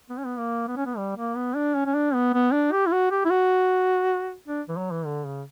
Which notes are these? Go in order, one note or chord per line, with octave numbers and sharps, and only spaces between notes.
B3
C#4
B3
A#3
B3
C#4
B3
G3
A#3
B3
D4
C#4
C#4
D4
B3
B3
D4
G4
E4
F#4
G4
E4
F#4
D4
E3
F#3
E3
D3
C#3